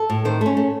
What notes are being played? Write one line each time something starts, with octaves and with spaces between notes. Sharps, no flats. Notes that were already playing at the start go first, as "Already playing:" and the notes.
Already playing: A4
A2
D#3 C5
A3 C#4
A3